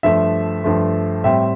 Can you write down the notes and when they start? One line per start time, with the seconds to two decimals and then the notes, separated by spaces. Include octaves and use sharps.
0.03 G2 F3 A3 E5
0.64 G2 F3 A3
1.24 A2 G3 C4 E5